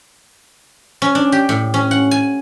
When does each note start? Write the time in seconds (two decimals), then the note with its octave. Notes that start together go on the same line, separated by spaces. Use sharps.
1.02 C#4
1.15 D4
1.32 G4
1.49 A2
1.74 C#4
1.91 F#5
2.11 G#5